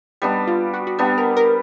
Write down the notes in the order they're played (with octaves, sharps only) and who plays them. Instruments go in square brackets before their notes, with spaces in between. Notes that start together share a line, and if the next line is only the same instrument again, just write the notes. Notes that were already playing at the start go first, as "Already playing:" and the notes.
[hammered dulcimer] G3 B3 D4 [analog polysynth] D#4
[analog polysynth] F4
F#4
F#4
[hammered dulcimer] G3 B3 D4 [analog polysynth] G4
[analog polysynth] A#4
A#4